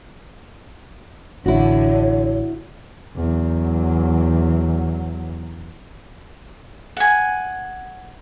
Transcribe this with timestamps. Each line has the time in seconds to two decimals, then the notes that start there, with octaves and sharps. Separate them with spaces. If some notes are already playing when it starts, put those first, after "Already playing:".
1.46 A1 D3 D4 E4 F#4 C#5
3.16 E2 F#3
6.97 F#5 G#5